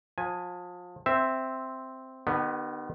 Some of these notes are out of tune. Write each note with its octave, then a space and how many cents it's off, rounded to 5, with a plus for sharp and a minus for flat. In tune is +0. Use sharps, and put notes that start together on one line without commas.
F3 +30 G#5 +0
C4 +0 E5 +0
D#3 -40 B3 +0 G4 -15